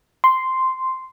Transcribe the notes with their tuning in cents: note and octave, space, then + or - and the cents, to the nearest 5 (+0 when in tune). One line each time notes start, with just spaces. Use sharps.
C6 -5